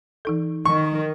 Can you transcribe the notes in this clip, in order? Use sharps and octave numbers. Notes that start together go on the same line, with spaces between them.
E3 D#4 A4
D#3 C#6